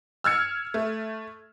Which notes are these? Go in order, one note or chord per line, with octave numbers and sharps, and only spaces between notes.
E6 F6 G#6 C#7
A3